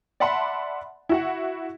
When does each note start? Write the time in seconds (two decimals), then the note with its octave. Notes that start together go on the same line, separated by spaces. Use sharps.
0.20 D5 E5 F#5 A5 B5 C6
1.09 E4 F#4 F#5